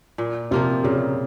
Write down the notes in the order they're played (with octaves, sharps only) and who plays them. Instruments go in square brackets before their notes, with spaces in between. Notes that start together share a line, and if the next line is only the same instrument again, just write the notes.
[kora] A#2
[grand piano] C3 [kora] F3 A#3 F4
[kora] A#2 [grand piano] C#3